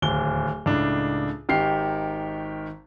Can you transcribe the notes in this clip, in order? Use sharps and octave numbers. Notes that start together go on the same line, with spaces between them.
D1 D#2 G7
C#2 A2 D4
G#1 D#3 G4 C7